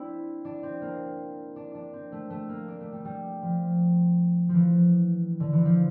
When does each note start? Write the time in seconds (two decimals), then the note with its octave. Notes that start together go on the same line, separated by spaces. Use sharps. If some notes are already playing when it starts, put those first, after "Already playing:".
Already playing: C4 D4 E4
0.45 D4
0.63 C4
0.82 A#3
1.56 D4
1.75 D4
1.93 C4
2.12 A3
2.30 A3
2.49 A#3
2.68 D4
2.80 A3
2.92 G3
3.05 G3
3.42 F3
4.49 F3
4.54 E3
5.40 D3
5.53 E3
5.65 F3